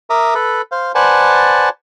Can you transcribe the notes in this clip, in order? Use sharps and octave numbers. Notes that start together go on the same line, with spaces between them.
A#4 E5 A#5 D6 D#6
A4 B4
C5 F5
B4 C5 D5 F#5 G#5 A5